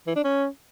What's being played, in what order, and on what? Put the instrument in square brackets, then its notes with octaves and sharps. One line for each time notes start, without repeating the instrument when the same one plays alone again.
[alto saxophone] E3
D4
C#4